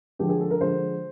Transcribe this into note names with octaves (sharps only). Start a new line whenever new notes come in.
D3 F3 G#3 G4
G#4
A4
A#4
D3 F3 G#3 C5